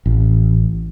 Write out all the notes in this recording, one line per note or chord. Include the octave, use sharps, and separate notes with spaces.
A1